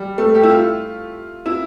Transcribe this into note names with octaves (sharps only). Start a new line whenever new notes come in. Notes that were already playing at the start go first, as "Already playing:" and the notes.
Already playing: G3
A3
G4
E4
F4
E4